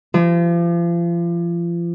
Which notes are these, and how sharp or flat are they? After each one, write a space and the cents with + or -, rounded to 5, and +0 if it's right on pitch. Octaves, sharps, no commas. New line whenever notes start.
F3 -35